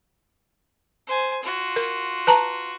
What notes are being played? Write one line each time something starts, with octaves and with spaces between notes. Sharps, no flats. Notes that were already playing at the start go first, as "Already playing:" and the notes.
C5 G#5
F4 F#4
A#4
B4 A5 A#5